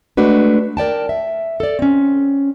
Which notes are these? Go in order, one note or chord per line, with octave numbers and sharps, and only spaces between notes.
G#3 A3 D4 F#4 B4
A#4 D5 G5 A5
E5
A4 D5
C4 C#4